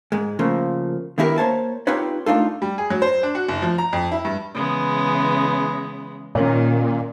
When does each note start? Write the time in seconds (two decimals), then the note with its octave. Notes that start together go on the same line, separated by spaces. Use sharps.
0.12 G#2 G#3
0.39 C#3 F3 A3 A#3
1.18 D3 D#3 B3 E4 G4 A#4
1.38 A#3 C5 C#5 A5
1.87 C4 D#4 F4 G4 B4 C#5
2.26 A3 D4 D#4 F4 A4
2.62 G3
2.78 G#4
2.90 F#3
3.02 C5
3.23 D4
3.35 F#4
3.49 F#1
3.62 F3
3.78 A#5
3.93 F2
4.12 E4
4.25 G2
4.54 C#3 E3 G#3 B3
6.35 A#2 D#3 C#4 A#4 C#5